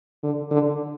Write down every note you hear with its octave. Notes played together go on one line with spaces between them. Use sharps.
D3
D3